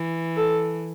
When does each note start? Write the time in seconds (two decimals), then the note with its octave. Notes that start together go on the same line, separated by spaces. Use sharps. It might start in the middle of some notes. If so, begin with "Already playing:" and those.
Already playing: E3
0.37 A4